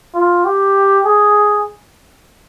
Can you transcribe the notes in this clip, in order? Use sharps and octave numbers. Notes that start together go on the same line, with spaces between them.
F4
G4
G#4